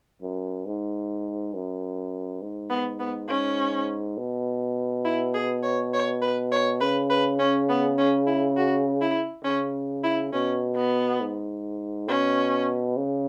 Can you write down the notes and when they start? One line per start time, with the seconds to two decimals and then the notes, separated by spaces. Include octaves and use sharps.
0.22 F#2
0.66 G#2
1.54 F#2
2.42 G#2
2.70 B3
3.00 B3
3.29 G#2 C#4
4.18 B2
5.05 E4
5.34 G#4
5.63 C#5
5.94 C#5
6.22 B4
6.52 C#5
6.81 C#3 B4
7.10 B4
7.39 C#4
7.69 B3
7.98 C#4
8.27 E4
8.57 F#4
9.01 E4
9.44 C#3 C#4
10.04 E4
10.33 B2 C#4
10.76 B3
11.21 G#2
12.08 B2 C#4
12.97 C#3